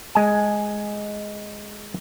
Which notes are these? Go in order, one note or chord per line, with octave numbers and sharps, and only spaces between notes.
G#3 G#5